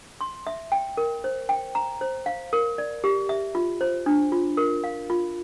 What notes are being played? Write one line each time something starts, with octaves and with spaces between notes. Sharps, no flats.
C6
E5
G5
A#4
C5
G5
A#5
C5
F5
A#4
D5
G4
E5
F4
C5
D4
F4
A#4
F5
F4